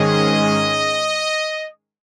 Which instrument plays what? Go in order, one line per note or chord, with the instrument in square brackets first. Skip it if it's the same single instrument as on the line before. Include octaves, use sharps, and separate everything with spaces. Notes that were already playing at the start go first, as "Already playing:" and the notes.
Already playing: [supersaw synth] G#2 D#3 G#3 C#4 G#4 [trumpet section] D#5